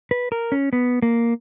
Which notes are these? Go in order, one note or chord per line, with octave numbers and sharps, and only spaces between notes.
B4
A#4
C#4
B3
A#3